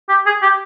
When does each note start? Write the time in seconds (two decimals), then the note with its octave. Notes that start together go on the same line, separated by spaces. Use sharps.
0.09 G4
0.26 G#4
0.43 G4